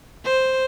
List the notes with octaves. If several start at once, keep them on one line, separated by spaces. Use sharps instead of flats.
C5